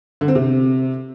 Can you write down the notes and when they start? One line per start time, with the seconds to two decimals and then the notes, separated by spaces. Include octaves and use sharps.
0.21 D3
0.28 C4
0.35 C3